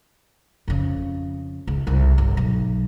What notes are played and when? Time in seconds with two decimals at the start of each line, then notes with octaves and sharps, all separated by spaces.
0.68 F2 C#3
1.67 C#2
1.87 C2
2.18 G1
2.37 B1